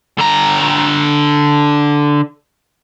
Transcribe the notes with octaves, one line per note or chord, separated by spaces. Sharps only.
D3 A#5